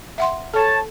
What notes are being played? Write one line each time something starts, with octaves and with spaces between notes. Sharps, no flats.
E5 F#5 C6
A4 C#5 A5